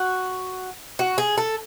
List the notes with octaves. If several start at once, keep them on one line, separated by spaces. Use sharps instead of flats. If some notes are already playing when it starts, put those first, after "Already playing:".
Already playing: F#4
F#4
G#4
A4